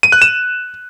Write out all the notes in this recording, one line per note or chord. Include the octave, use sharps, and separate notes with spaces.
D#7
F#6
E7